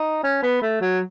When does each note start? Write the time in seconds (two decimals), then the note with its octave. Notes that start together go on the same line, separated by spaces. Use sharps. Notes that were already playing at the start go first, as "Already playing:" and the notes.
Already playing: D#4
0.24 C#4
0.43 B3
0.62 A3
0.81 F#3